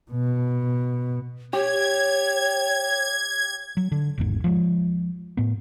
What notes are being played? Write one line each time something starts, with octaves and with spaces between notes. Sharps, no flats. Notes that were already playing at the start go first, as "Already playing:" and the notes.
B2
G4 C#5 G#6
F#3
D3
G#1 E2 G#2
F3 F#3 G#3
A2 B3